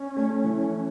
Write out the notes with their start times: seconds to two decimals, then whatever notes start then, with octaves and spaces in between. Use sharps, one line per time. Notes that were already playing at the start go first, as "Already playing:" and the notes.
Already playing: C#4
0.17 A3
0.44 E3